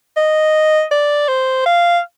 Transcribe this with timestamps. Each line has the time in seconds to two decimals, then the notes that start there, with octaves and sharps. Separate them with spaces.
0.17 D#5
0.91 D5
1.28 C5
1.66 F5